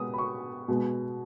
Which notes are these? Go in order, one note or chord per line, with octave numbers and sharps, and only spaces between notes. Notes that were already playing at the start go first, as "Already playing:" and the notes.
Already playing: B2 G#3 B3 D#6
B5
C#6
B2 G#3 B3